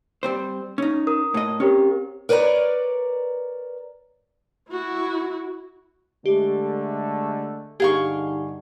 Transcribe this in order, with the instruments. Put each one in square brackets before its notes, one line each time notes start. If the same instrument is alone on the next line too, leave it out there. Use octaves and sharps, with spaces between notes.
[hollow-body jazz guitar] G3 C4 C5
C#4 D#4
[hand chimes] A#4 D#6
[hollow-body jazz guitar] A2 D#5
[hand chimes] C4 G4 A#4 [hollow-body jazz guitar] C#4
[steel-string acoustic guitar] A#4 B4 C#5 D5 A#5
[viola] E4 F#4
[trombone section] D3 A3 [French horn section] G#3 [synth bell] G4
[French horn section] G2 D3 D#4 [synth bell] G4 [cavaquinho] G#4 F5 C#6